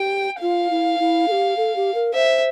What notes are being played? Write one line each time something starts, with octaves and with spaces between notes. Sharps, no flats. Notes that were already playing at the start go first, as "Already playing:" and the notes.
Already playing: G4 G5
F4 F5
E4
E4
A4
G4
A4
G4
A#4
C5 E5